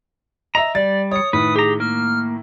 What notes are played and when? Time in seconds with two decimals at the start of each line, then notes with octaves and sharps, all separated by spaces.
0.55 D#5 E5 A#5
0.75 G3 D5 A6
1.11 C#5 D#6 C#7
1.33 A2 D#3 B4 D#6
1.56 G4 G#4 A#5
1.80 A#3 F6